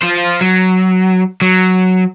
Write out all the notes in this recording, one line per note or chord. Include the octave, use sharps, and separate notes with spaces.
F4 C5
F#3
F#3